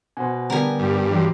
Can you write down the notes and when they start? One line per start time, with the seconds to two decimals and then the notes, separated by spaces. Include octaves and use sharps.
0.17 B2 C5 F#5 G#5
0.50 D3 G3 B3 G4 A#4 G#5
0.79 G2
1.11 E3 F#3 G#3